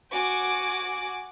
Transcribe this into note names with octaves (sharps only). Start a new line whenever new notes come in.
F#4 G#5 D6